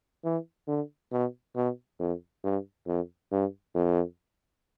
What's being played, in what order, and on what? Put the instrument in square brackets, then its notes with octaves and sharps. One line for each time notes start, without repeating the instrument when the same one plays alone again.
[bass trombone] E3
D3
B2
B2
F2
G2
F2
G2
F2